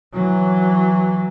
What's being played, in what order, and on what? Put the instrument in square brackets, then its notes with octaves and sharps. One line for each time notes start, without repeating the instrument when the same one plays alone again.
[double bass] E3 F#3